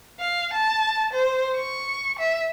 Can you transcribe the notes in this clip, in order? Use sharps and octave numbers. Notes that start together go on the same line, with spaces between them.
F5
A5
C5
C#6
E5